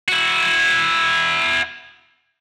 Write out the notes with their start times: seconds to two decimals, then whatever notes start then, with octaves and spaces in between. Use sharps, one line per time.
0.08 E4 F#4